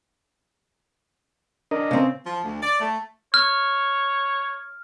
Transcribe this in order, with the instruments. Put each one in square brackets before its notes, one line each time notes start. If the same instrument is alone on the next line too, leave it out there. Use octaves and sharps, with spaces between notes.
[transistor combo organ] D4 A#4 D#5
[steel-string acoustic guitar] C#3 C4
[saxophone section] F3
D2
D5
A3
[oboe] C#5 [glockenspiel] F6